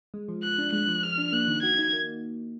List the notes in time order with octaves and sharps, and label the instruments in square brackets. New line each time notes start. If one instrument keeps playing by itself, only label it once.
[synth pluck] G#3
F3
[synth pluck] F3 [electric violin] F#6
[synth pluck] D4
[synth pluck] G#3 [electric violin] F#6
[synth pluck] F3
[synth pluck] F3 [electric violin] F6
[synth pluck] D4
[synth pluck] A#3 [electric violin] F#6
[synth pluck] D#3
[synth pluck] F#4 [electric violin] G#6
[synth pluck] D#4
A#3